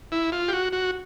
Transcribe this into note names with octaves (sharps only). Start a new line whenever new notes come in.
E4
F4
G4
F#4
F#4